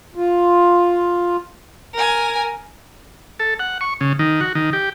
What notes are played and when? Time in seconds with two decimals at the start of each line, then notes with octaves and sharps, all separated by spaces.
0.15 F4
1.94 A#4 G#5
3.40 A4
3.59 F#5
3.81 C#6
4.01 C#3
4.19 D#3
4.41 F#4
4.55 D#3
4.73 G4